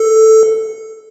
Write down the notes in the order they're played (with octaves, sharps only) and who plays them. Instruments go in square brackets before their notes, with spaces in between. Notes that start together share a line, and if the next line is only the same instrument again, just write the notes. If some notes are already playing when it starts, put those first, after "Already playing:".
Already playing: [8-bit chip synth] A4